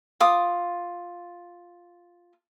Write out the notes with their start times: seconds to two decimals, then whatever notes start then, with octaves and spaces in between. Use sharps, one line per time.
0.20 F4 D6 D#6